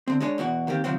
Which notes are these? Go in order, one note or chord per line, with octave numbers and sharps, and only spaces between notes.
D3 C4
G#3 D4 G#4 C#5
E2 B2 E3 F#4
D#3 A#3 C4 G4
C3 D#3 F3 F#3 C4